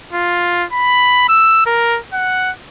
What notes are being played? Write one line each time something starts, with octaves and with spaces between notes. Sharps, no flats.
F4
B5
E6
A#4
F#5